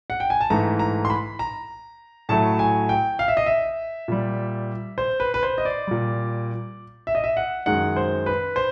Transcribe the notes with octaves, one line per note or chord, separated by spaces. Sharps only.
F#5
G5
G#5
A5
G#2 E3 A3 A#5
A#5
C6
B5
A#5
A2 F#3 A3 A5
G#5
G5
F5
E5
D#5
E5
A#2 G3
C5
B4
B4
C5
D#5
D5
A#2 G3
E5
D#5
E5
F#5
F#2 D#3 G#3 F#5
C5
B4
C5